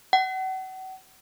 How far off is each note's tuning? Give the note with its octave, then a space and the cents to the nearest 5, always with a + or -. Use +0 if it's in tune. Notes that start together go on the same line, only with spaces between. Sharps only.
F#5 +35